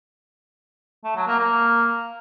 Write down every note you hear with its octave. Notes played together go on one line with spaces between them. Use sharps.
A3
F#3
A#3
A#3